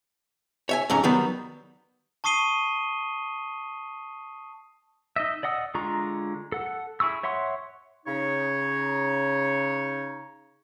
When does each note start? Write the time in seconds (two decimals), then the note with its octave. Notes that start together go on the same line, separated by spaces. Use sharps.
0.69 C#5 E5 G#5
0.90 F2 G#2 C#4 A#5
1.04 D#3 F#3 G3 B3
2.24 A5 C#6 D#6 C7 D#7 G7
5.16 D#4 D#5 E5
5.43 D5 D#5 F#5 D#6 E6
5.74 D3 G#3 F4 A#5 C#6
6.52 A4 F#5
7.00 E4 G#4 C#6 E6
7.23 C#5 E5 F#5 C6 C#6
8.06 C#3 D#4 C#5